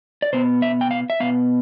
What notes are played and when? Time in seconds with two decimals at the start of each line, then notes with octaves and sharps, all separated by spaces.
0.22 D5
0.33 B2 B3 C5
0.62 E5
0.81 G5
0.91 F5
1.10 E5
1.20 B2 B3 F5